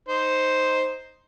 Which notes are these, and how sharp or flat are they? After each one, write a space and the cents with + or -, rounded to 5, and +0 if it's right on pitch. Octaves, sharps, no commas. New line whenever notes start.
D#4 +0 C5 +0